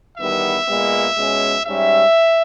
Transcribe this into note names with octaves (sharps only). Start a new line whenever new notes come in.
E2 D#3 G3 B3 E5
A#2 G#3 B3
B2 G#3 C#4
G#2 G3 C#4 E5